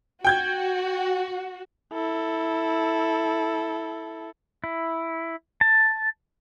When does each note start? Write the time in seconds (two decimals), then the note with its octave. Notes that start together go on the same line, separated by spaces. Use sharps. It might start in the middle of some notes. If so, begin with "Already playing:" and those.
0.24 F#4 G5 G6 G#6
1.93 E4 A4
4.64 E4
5.61 A5